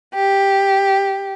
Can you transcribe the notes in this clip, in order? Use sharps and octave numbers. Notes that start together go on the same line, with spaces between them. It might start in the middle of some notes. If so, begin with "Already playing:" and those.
G4